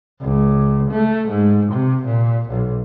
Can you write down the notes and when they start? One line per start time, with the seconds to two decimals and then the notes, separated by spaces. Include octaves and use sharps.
0.21 C#2
0.91 A3
1.28 G#2
1.72 C3
2.05 A#2
2.50 B1